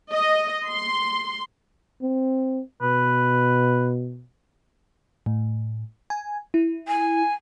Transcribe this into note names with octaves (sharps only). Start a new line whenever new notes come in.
D#5
C6
C4
B2 B4
A2
G#5
E4
G#5